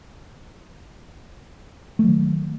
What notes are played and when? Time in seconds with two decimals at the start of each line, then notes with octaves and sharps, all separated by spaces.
1.99 A3
2.04 F#3
2.08 D#3